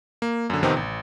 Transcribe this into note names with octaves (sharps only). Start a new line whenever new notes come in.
A#3
F#2 D3
F2 C3 D#3 B3 C4 D#4
A1